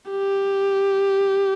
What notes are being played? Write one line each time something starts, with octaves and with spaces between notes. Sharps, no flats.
G4